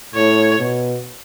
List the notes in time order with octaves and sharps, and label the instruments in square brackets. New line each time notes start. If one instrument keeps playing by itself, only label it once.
[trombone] A2 [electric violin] C#5
[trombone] B2